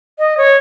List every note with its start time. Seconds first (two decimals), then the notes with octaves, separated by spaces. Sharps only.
0.18 D#5
0.37 C#5